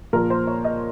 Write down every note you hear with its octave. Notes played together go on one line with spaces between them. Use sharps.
A#2 F3 A#4
C5
C#5
D#5